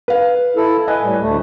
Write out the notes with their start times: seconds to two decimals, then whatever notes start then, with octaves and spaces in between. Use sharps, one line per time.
0.08 B4 F5
0.56 E4 A4
0.88 B4 D#5 G#5
1.02 A2 G3
1.21 D2 A3